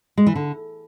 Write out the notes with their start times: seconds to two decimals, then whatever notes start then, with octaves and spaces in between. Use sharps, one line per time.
0.18 G#3
0.27 E3
0.36 D3